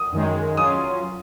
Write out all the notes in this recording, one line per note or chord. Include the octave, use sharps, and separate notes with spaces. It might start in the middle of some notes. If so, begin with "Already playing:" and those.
Already playing: D#6
F#2 D#3 G#3
F#3 C#4 F4 D#6